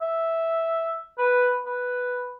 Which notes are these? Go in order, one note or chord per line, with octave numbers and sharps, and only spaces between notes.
E5
B4
B4